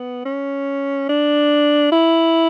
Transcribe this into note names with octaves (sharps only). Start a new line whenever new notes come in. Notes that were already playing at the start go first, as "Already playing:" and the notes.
Already playing: B3
C#4
D4
E4